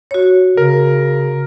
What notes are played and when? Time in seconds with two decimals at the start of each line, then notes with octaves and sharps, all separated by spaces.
0.11 F#4 C#5
0.57 C#3 A#4